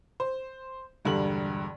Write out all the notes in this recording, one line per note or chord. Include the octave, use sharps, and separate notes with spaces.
C5
E1 G2 D3 F#7